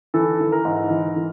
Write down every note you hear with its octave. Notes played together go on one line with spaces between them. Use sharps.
E3 A4
E3
A#4
G#2
E3
E3